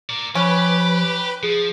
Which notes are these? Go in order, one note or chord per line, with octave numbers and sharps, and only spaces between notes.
A#4 D5
F3 C#4 G4 B4 B5
F3 G#4